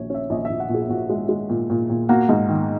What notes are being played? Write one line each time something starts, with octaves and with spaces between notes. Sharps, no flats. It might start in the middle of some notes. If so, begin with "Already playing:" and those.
Already playing: A#1 C#5
C#4 E5
A#1 D#5
E5
A#1
F#5
A#2
G#4
A#2 F#4
G#3
G#3
A#2
A#2
A#2
A#3 F#4
G#2
D#3